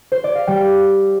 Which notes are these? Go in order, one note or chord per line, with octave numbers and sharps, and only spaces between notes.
C5
D5
F5
G3 G5